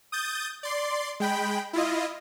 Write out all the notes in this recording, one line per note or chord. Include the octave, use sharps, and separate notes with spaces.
D#6 G6 A6
D5 C6
G#3 G5 B5
E4 F4 D#5